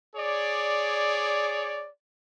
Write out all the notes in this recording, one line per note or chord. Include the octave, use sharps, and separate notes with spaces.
G#4 C#5 D5